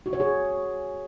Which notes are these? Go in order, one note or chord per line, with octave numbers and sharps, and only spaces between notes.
F#4
C#5
G#4